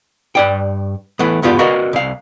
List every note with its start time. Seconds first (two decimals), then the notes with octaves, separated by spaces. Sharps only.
0.35 G2 D5 G5
1.19 E3 A3 B3
1.42 E2 G2 D3 B3 F4 G4
1.59 F#4 A#4 B4 D5 D#5 F5
1.93 C2 F5